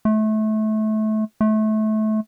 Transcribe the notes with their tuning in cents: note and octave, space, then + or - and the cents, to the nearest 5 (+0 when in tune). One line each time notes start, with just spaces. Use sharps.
A3 -25
A3 -25